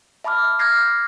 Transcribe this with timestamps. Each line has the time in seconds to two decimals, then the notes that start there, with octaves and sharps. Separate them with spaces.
0.24 E5 A5 B5 D6 F6
0.59 D6 F6 G6 G#6 A#6 C7